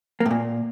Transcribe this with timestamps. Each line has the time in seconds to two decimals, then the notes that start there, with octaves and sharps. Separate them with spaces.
0.20 A#3
0.26 A2
0.31 A#2